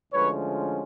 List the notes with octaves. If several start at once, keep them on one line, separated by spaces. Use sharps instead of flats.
D2 D3 F3 G#3 C#4 B4 C#5